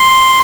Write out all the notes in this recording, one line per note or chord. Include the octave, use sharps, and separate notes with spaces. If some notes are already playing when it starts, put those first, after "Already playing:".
Already playing: C6